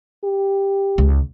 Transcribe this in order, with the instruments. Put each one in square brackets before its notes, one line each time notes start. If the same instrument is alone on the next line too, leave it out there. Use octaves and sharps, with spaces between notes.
[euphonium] G4
[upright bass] C#2